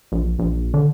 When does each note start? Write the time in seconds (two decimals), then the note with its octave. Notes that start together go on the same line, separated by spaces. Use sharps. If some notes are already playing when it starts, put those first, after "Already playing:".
0.12 A#1
0.39 A#1
0.74 D3